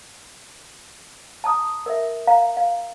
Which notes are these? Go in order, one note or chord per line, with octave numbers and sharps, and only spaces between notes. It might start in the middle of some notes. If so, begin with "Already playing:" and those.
A5 A#5 D#6
A#4 E5
F5 A#5
F5